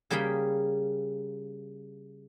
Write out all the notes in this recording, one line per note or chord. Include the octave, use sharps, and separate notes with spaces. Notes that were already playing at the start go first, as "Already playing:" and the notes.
C#3 G3 A#3 G#4 G5 B5